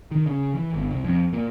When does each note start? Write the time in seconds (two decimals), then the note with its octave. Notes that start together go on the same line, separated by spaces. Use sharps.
0.11 D#3
0.26 C#3
0.55 E3
0.73 G1
0.91 C2
1.04 F2
1.33 A#2